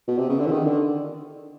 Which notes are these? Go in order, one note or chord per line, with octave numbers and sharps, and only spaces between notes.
B2
C3
C#3
D3
E3
D#3
D3